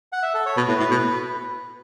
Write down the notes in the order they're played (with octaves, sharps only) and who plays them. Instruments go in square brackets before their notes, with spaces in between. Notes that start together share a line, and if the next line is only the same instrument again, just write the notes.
[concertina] F#5
E5
A4
C#5
[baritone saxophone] B2 [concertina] B4
[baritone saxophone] A2
A2
B2